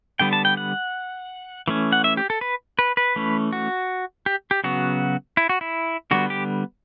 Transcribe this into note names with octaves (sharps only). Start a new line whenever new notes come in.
D3 G3 B3 G5
A5
G5
F#5
E3 A3 C#4
F#5
E5
G4
A4
B4
B4
B4
E3 A3 C#4
F#4
G4
G4
C#3 F#3 B3 F#4
E4
F#4
E4
D3 G3 B3 F#4
G4